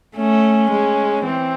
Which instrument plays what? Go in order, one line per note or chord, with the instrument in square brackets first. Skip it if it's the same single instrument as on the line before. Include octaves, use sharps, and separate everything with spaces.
[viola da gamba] A3 [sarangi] C#4
[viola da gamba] G#3
[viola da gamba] E3 [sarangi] C4